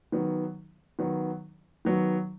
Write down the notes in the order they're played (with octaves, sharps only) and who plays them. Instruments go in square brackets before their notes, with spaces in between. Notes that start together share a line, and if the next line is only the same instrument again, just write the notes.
[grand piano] D#3 F#3 B3
D#3 F#3 B3
D#3 F#3 B3